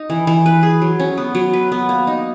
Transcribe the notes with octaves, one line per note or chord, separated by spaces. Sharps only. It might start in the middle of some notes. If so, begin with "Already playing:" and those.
Already playing: D#4
E3
E3
B4
G#4
F#3
C#4
B3
F#3
B4
B3
A#3
D#4